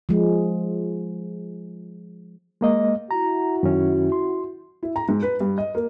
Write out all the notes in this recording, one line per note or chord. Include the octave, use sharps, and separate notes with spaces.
F3 G#3
G#3 A#3 D#5
E4 F#4 A#5
F#2 D#3 C#4
C6
E4
A#5
G#2
B4
G2
D#5
A#3